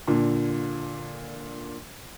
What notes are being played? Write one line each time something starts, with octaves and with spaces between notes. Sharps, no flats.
A#2 D3